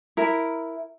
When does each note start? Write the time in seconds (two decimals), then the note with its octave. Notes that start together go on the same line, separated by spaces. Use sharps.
0.17 E4 A#4